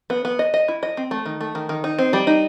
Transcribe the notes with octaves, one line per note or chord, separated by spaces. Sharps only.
B3
B3
D#5
D#5
E4
D#5
C4
A3
D#3
A3
D#3
D#3
D#4
C4
G3
D#4